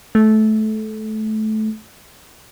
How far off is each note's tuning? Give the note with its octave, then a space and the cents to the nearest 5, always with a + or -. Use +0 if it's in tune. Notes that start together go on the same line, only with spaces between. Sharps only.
A3 -20